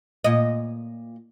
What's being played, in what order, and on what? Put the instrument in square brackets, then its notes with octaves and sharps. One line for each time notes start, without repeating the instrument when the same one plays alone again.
[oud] A#2 D#5